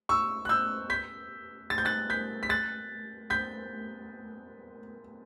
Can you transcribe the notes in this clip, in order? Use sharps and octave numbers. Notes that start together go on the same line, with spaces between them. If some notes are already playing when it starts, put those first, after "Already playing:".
C#6 E6
F#6
E6 G6
G6 B6
A6
G6
F#6 A6
G6 B6
B6
F#6 A6
G6 B6